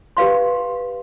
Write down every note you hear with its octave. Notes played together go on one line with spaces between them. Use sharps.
G4 B4 F5 C6